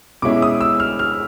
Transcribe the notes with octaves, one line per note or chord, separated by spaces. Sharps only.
B2 G#3 C#4 E4 D6
D#6
E6
F6
F6